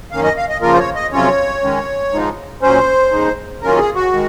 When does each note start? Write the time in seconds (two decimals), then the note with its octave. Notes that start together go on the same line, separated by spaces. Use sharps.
0.12 F#2 D#3 A#3 C#4 F5
0.24 D#5
0.37 F5
0.49 D#5
0.62 C#3 F3 A#3 F4 A#4
0.74 C5
0.78 C#5
0.95 D#5
1.11 F2 C3 F#3 C#4 F4 C#5
1.62 D#3 G#3 C#4
2.12 G#2 F3 G#3 D#4
2.62 A#2 F#3 C#4 C5
3.11 D#2 C#3 G#3 D#4
3.61 D#3 F#3 A#3 C#4 F4 A#4
3.78 G#4
3.95 F#4
4.12 D#3 G#3